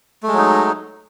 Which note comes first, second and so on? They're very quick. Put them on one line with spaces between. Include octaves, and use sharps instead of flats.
A3 G#3 F#3 D#4